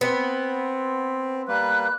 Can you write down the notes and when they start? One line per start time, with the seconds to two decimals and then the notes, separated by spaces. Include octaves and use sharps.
0.01 B3 C4
1.48 G3 A#3 B4 F#6